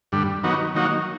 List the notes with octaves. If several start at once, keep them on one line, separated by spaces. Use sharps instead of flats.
G2 D3 G3
D#3 F#3 B3 D#4 F#4
D#3 F#3 A#3 D#4 F#4